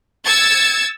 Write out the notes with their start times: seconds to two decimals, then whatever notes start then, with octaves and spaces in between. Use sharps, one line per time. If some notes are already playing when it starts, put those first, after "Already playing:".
0.25 E6 G#6 A6 C#7